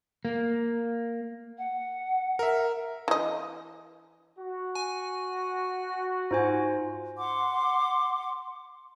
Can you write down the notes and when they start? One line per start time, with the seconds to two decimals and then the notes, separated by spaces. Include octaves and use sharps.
0.25 A#3
1.58 F#5
2.39 A#4 E5
3.08 E3 D#5
4.39 F#4
4.75 G#5
6.31 G#2 F4 C5 G#5
7.17 F#5 C6 D6